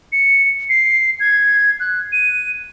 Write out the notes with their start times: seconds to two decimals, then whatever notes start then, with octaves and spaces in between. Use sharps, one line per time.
0.12 C#7
0.69 C7
1.20 G#6
1.80 F#6
2.12 D#7